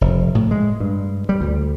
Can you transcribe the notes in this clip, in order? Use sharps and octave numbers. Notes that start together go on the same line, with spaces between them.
F1
A2
G#3
G2
G3
D2